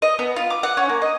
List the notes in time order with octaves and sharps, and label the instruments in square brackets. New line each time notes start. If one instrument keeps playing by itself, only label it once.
[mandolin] D#5
B3
F4
D6
F#5
C#4
A#3
D#5